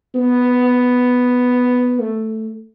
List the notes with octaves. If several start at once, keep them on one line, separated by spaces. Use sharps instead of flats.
B3
A3